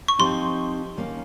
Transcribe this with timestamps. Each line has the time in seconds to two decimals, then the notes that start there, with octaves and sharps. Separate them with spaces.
0.08 C#6
0.19 F3 C4 D#4 G4 C6
0.97 D#3 A#3 C#4